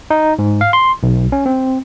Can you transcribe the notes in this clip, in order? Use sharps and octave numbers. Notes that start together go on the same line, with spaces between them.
D#4
G#2
F5
C6
B1
C#4
C4